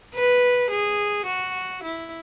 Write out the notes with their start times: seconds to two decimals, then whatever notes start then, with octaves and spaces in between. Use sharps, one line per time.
0.14 B4
0.71 G#4
1.26 F#4
1.83 E4